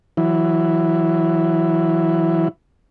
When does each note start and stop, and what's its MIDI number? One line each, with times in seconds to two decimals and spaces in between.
0.17 2.48 52
0.17 2.48 54
0.17 2.48 64